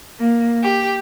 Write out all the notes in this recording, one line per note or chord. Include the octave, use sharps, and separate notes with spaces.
A#3
G4